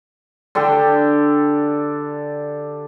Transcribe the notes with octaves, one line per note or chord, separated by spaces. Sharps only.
D3 D4 G4 A4